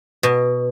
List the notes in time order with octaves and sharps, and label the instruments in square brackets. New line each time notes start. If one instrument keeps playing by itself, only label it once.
[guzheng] B2